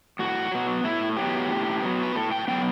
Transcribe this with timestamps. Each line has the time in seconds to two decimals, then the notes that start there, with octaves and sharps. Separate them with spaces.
0.19 A2 F#4
0.52 F#3 B3
0.84 A2 E4
1.17 F#3 B3 G4
1.51 A2
1.82 F#3 B3
2.03 B4
2.15 A2 A4
2.32 G5
2.48 F#3 B3 G5